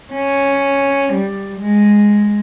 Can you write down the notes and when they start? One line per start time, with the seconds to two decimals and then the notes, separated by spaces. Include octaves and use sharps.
0.13 C#4
1.14 G3
1.60 G#3